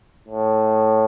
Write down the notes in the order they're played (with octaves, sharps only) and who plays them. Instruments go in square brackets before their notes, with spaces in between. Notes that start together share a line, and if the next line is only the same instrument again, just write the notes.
[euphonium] A2